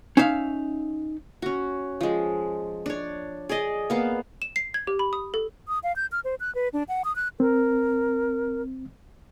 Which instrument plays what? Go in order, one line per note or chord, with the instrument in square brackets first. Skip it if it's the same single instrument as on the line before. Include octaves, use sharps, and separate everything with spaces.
[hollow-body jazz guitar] C#4 D#4 E5 F5
[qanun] C#4 F#4
F3 G#3
D4 C#5
G#4 D5 D#5
A#3 B3 F5
[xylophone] E7
C7
G#6
G4
B5
D#6
A4
[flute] D#6
F5
G6
F6
C5
F#6
B4
D4
F#5
D#6
F#6
[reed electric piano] C4 [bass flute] A#4